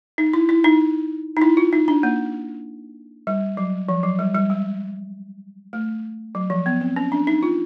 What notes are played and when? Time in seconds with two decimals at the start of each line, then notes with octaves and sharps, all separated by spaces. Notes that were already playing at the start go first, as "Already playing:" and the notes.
0.18 D#4
0.33 E4
0.49 E4
0.64 D#4
1.37 D#4
1.42 E4
1.57 F4
1.73 D#4
1.88 D4
2.03 A#3
3.27 G3
3.57 F#3
3.89 F3
4.03 F#3
4.19 G3
4.35 G3
4.50 G#3
5.73 A3
6.35 F#3
6.50 F3
6.66 B3
6.81 C4
6.96 C#4
7.12 D4
7.27 D#4
7.43 F4